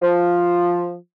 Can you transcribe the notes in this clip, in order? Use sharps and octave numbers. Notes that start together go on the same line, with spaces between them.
F3